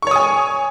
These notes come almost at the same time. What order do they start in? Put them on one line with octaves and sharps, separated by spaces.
C#6 C#5 D#6 G#5